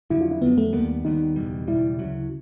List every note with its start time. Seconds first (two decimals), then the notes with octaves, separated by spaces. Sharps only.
0.10 F2 D3 F#3 E4
0.21 F4
0.31 E4
0.42 F2 D3 F#3 B3
0.58 A3
0.73 D#2 D#3 G3 A#3 B3
1.05 D#2 D#3 G3 B3 D#4
1.36 F#1 E2 B2 G3
1.68 F#1 E2 B2 G3 E4
1.99 D2 C#3 F#3